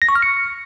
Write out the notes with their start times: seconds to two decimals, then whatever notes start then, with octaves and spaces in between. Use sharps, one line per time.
0.02 A#6
0.09 C#6
0.15 F6
0.22 C#7